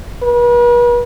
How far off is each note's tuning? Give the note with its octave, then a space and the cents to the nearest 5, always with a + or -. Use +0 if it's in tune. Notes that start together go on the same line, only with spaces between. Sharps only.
B4 -40